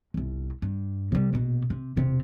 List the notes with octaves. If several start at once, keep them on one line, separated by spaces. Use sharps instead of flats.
G1 C2
G2
C3 G3
A#1 B2
C3
E1 C3